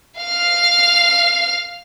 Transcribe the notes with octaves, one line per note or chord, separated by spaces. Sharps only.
F5 F6